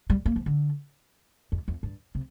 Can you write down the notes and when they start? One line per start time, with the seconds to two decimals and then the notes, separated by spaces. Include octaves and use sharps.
0.10 G3
0.26 A#3
0.36 F3
0.46 D3
1.52 F2
1.68 F2
1.83 G2
2.15 C3